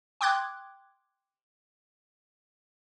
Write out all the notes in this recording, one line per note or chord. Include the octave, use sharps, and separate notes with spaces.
G5 C6 D6 D#6 F#6 G#6